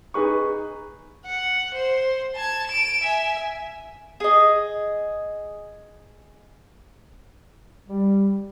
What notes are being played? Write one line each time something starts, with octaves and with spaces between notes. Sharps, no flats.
D#4 G#4 B4 C#6
F#5
C5
A5 G#6
D7 E7
E5 G#5
G#4 D#5
G3